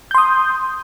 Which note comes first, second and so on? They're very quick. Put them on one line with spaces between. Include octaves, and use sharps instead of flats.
G6 C6 D#6